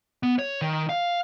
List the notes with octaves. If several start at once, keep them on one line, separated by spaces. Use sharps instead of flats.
B3
C#5
D#3
F5